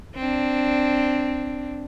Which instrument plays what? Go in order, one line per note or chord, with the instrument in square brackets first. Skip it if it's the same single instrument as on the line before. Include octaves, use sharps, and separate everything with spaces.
[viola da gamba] C4 D4